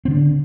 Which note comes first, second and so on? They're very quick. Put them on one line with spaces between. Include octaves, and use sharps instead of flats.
C4 D3 D4